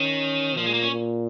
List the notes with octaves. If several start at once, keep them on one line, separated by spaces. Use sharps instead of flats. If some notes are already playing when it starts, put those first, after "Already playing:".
Already playing: D#3 C#4
A#2 F3
G#3
A#3
C#4
A#2